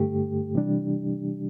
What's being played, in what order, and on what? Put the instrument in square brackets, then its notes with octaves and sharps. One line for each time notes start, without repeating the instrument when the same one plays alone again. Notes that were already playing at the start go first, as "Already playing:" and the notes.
Already playing: [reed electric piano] G2 D3 A3 G4
C3 E3 G3 D4